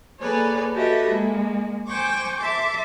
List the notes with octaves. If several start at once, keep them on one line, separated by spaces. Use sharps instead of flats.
A#3 G#4 A4 B4 C#5 D5
F#4 G4 A4 B4 D#5 E5
G#3 A#3
C5 G5 G#5 C#6 D6
E5 A5 C6 D6